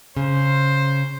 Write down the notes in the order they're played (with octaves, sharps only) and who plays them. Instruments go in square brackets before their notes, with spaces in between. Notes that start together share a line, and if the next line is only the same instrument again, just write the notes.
[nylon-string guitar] C#3 [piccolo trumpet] C5